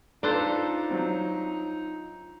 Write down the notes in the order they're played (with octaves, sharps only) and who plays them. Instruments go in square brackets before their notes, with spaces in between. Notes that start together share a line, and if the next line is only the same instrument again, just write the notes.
[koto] D4 A4 C5 [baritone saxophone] D#4 [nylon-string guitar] F4 D5 [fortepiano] B4
[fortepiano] F#3 C4